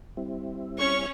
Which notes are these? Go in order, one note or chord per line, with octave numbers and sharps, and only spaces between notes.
G3 C4 E4
C#4 C#5 C#6